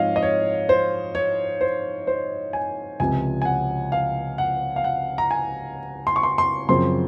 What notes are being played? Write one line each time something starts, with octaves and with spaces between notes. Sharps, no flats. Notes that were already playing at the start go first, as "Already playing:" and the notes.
Already playing: G#2 F3 C4 C#5 D#5 F5
D#5
C#5
C5
C#5
C5
C5
G#5
C#2 C3 F3 G#5
G#5
F#5
F5
F#5
F5
F#5
A#5
G#5
C6
C#6
C6
C6
F#2 C#3 F3 C4 C6